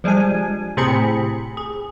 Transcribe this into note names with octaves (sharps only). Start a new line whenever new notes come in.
F3 G3 G#3 D4 G#5
A2 C3 C4 G#4 B5 C#7
G#4